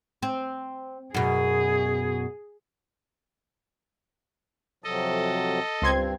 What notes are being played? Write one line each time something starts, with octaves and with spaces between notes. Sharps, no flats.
C4
F#2 B2 G#4
F2 C3 F#3 A4 D#5
C#2 G2 C4 C6 G#6